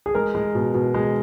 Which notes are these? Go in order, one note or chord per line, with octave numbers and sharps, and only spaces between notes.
G#4
G#3 A#4
G#3
B2
B2
G#3